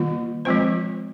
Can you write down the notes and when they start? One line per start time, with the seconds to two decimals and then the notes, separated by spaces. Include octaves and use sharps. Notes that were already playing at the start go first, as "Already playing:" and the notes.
Already playing: D#3 G3 A#3 F4
0.45 F3 G#3 C4 F4 C5